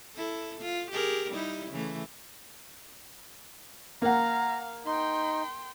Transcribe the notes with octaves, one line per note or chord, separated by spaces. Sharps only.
E4 A4
F4
G4 G#4 A#4
G3 D#4 E4
C#3 E3 A3
A#3 F5 F#5 A#5
D#4 G5 C6